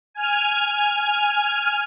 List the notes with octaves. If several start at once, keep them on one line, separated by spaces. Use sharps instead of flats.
G#5 F6